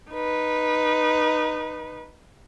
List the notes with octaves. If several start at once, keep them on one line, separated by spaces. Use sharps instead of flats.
D#4 B4